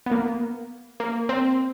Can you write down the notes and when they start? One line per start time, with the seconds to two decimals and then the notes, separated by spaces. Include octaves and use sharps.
0.06 B3
0.11 A#3
1.00 A#3
1.29 C4